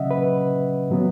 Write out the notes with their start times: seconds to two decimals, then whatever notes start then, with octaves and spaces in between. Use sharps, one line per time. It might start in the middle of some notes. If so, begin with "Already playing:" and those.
Already playing: C#3 F#3 C#4 D#5 E5 F#5
0.11 B4
0.90 A2 F#3 B3